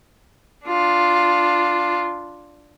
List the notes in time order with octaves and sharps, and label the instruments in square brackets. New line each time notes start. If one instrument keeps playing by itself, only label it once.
[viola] D4 F4